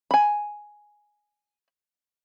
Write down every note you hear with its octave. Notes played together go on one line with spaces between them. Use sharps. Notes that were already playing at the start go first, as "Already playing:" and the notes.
G#5 B5